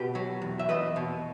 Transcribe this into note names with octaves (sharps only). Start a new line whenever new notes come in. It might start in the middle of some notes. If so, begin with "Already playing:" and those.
Already playing: B2 G4 B4
F#3
E2
E5
E2 B4 D#5
B2